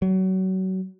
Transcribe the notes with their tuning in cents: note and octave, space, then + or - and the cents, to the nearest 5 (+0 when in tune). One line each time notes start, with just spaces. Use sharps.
F#3 +30